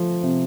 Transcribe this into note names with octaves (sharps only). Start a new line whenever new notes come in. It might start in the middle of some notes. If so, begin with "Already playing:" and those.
Already playing: F3 A3
C3